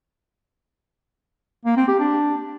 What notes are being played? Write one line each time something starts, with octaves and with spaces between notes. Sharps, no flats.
A#3
C4
G4
D4